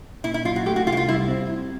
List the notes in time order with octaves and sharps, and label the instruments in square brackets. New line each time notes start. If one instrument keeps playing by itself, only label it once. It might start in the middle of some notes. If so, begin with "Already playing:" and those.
[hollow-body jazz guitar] A#2 [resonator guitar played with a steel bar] E4
[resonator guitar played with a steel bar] E4
[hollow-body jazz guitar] F#3 [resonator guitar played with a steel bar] F4
[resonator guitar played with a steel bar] F#4
[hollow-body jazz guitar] A3 [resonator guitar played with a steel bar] G4
[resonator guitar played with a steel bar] F#4
[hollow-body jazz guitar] C2 [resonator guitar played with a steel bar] F4
[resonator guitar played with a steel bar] E4
F4
[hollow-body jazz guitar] G3 [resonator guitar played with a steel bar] E4
[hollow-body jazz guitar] C4
E4